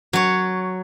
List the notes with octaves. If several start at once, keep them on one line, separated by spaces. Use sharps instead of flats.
F#3 C#5